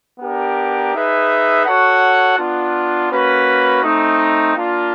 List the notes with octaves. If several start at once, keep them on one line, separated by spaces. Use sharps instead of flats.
B3 D4 G4 A#4
D#4 G#4 B4 E5
F#4 A4 C#5 F#5
B3 D4 F4
A#3 C#4 F#4 B4
A3 C4 D#4
A#3 D4 F4